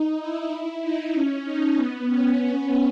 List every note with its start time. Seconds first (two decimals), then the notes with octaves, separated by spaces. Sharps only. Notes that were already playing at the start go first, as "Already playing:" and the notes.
Already playing: D#4
0.20 E4
0.51 E4
0.82 D#4
1.13 C#4
1.45 D#4
1.75 B3
2.06 C#4